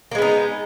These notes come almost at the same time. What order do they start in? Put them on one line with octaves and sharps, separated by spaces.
A#3 G#3 B3 D#4